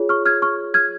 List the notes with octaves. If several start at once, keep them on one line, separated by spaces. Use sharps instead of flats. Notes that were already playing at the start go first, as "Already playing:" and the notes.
Already playing: F4 G#4 C#5
C#6 F6
F6 G#6
C#6 F6
F6 G#6